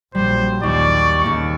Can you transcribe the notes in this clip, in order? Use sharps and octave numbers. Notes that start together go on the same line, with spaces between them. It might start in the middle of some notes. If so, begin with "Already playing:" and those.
A#1 A#2 F#3 G3 C5
D#2 D5 C#6
D#2 C#3 A#3 C#7